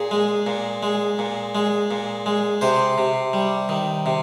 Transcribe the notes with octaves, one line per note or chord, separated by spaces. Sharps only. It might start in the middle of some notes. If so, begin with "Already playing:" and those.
Already playing: A#2 G#4
G#3
A#2
G#3
A#2
G#3
A#2
G#3
C3 C5
C3
G3
D#3
C3